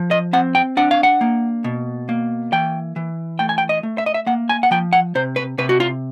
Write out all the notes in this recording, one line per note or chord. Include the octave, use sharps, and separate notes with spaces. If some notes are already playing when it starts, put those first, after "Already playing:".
Already playing: F3
D#5
C4 F#5
G5
D4 F#5
F5
F#5
A#3
B2
A#3
E3 G5
E3
A3 G5
G#5
G5
D#5
A3
E5
D#5
E5
A#3 F#5
G#5
F#5
F3 G5
F#5
C3 C5
B4
C3 B4
F#4
F4